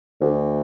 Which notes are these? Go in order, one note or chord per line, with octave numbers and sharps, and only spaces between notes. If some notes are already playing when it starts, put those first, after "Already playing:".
D2